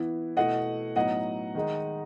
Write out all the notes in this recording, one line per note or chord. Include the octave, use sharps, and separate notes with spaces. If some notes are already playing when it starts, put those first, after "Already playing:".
Already playing: E3 B3 E4
B2 A3 E4 D#5 F#5
A2 F#3 B3 D#4 D#5 F#5
D#3 G#3 D#4